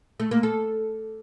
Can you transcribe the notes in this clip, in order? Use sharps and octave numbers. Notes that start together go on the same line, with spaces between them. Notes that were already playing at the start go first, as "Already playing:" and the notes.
A3
A#3
A4